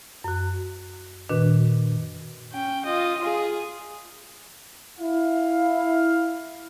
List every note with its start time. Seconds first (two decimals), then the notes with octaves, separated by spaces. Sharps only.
0.24 F#2 F#4
1.29 A#2 D#3 D4 F#4 B4
2.53 C#4 G5
2.85 F4 D#5
3.21 F4 G#4
5.00 E4 F5